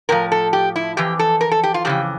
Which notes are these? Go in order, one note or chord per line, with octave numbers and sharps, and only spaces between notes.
A2 F3 A#4
A4
G4
E4
F2 E3 G4
A4
A#4
A4
G4
F4
F2 C#3 E3 G4